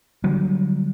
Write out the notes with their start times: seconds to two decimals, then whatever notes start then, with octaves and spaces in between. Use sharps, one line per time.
0.24 D3 F#3 G3